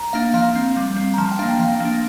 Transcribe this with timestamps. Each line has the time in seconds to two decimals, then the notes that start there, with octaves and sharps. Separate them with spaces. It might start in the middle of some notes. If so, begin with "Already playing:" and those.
Already playing: A#5
0.13 A#3 D4 F5
0.34 F3 F5
0.55 C4
0.77 G3
0.96 C4
1.14 A#5
1.18 F3 A5
1.31 G5
1.39 A#3 D4 F5
1.59 F3 F5
1.80 A#3 D4